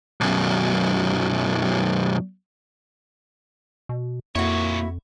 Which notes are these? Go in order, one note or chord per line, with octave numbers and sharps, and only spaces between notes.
B1 F#2
B2
F2 A#2 A#3 E4 F#4 C#5